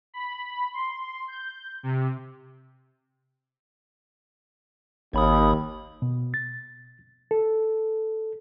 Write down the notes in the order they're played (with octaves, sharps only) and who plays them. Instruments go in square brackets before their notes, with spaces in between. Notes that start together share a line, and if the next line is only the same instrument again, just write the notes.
[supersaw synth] B5
C6
G6
C3
[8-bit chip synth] G#1 B5 D#6 [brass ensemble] D#2
[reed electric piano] B2
A6
A4